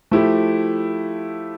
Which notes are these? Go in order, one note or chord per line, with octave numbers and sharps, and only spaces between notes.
F3 A3 E4 G4